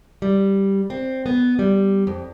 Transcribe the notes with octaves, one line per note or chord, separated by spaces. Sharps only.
G3
C4
B3
G3
F2